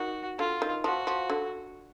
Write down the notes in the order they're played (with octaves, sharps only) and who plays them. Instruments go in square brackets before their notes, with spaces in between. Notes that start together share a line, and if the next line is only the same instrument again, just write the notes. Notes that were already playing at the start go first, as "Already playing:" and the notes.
Already playing: [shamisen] D#3 [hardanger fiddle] F#4
[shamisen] D3 [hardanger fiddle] F4
[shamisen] D#3
[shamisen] F3 [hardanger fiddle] F#4
[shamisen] F3
D3